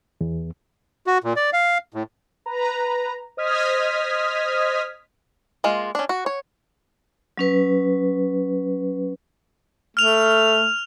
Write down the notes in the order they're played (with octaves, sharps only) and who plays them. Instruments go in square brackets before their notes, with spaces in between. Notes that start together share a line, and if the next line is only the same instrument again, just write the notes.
[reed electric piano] E2
[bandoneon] F#4
A#2
D5
F5
A2
[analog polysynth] B4 A#5
C5 D#5 D#6 F6 G#6 B6
[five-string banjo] G#3 A#3 F4
C#4 D4
F#4
C#5
[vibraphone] F#3 C#4 B4
[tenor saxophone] A3 [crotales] F6 F7